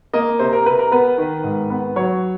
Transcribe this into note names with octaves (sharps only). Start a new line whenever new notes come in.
A#3 D#5
C3 C5
A#4
C3 B4
A#4
B3 B4
D#3
G#2
B3
F#3 C#5